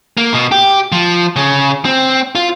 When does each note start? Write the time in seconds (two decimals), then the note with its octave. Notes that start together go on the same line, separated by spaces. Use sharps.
0.17 A#3
0.34 B2
0.52 G4
0.92 F3
1.36 C#3
1.85 C4
2.35 F4